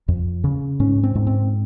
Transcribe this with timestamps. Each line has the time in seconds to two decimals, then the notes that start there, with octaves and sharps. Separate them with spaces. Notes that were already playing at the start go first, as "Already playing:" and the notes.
0.08 F2
0.44 C#3
0.80 G#2 C#4
1.03 C4
1.15 G#2
1.27 C4